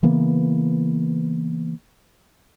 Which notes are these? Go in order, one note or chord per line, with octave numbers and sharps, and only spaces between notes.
C#3 E3 A#3 B3